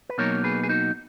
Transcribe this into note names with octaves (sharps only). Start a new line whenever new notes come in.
B4
B2 F#3 A#3 D#4 A#4 C#5
G#4 B4
G#4
D#4 F#4